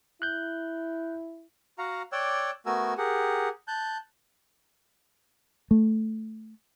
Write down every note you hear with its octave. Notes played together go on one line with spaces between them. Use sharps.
E4 F#6 G6
F#4 F5 F#5 A#5
C#5 D5 G5 D6 E6 F#6
A3 B3 F#4 A#4 G#5 E6
G4 G#4 A#4 F#5
A5 F#6 G6
A3